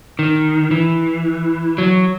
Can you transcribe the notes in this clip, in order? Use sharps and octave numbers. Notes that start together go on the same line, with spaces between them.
D#3
E3
F#3